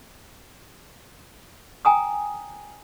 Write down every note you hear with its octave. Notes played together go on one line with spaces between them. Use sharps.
G5 G#5 A#5 D#6